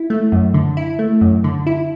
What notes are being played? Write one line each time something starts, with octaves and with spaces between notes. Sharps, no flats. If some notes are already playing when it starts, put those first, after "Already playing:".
Already playing: E4
A3
F#2
D3
E4
A3
F#2
D3
E4